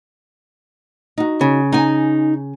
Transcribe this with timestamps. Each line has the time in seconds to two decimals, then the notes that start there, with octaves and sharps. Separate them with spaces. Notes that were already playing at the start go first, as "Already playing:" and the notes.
1.18 D#4 F#4
1.41 C#3
1.72 D#4 G#5